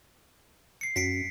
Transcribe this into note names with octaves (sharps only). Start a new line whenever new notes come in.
C7 C#7
F#2 B6 C#7 D7